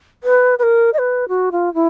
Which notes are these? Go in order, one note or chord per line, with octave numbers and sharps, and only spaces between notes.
B4
B4
A#4
D#5
B4
F#4
F4
E4